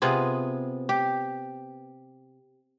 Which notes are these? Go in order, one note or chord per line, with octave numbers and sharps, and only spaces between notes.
C3 B3 F4 G#4
G4